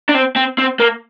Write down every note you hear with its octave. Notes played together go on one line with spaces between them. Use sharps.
D4
C4
C4
C4
A#3